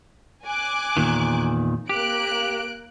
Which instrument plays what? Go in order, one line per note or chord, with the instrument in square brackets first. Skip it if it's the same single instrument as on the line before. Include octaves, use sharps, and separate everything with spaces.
[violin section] G#5 D6 F#6
[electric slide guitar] E2 A#2 D#3
[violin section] A#3 F#6 D7 [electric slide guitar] G4